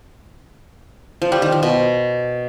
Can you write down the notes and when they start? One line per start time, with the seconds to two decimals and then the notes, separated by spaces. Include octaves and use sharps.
1.22 F3
1.32 G3
1.42 D#3
1.52 F3
1.63 B2